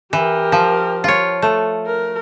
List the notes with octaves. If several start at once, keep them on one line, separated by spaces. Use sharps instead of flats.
E3 G4 A#4
F3
F4 C#5
A3
A#4